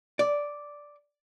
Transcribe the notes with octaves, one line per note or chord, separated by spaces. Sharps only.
D5